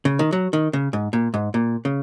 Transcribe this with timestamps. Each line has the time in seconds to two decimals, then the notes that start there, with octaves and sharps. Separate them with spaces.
0.05 C#3
0.19 D#3
0.32 F#3
0.53 D#3
0.73 C#3
0.93 G#2
1.13 A#2
1.34 G#2
1.54 A#2
1.85 C#3